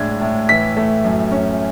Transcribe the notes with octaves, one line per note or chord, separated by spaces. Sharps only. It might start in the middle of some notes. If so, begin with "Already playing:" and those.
Already playing: A2 G#3 D4 G#6
A2
E3 B6
A3
F#2
C#4